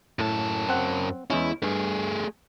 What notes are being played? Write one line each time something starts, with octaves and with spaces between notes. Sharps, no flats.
F#2 A2 A5
C4 F#5
E2 G#3 C#4 E4
G2 A3 G#4